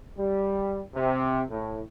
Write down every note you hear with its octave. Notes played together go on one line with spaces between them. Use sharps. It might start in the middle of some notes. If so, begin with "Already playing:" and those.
G3
C3
A2